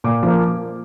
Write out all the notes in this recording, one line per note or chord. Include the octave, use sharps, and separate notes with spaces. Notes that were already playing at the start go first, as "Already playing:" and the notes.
A#2 D6
F3 A#3